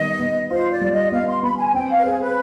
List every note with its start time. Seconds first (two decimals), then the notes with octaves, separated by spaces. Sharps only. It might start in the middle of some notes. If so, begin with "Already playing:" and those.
Already playing: D#3 G3 B3 D#5
0.19 B3
0.51 F4 C5
0.71 D5
0.81 G3
0.91 D#5
1.12 B3 F5
1.28 C6
1.43 B3 B5
1.58 G#5
1.74 C4 G5
1.89 F5
1.98 B4
2.04 G#4 C5
2.21 B4